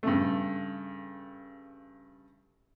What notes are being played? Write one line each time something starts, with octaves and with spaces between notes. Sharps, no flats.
G2 C#3 A3